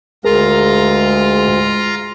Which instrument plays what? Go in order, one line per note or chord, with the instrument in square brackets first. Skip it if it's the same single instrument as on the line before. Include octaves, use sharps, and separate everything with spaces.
[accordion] D2 [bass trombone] G#3 [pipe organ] F4 A#5 [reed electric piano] G#4 A#4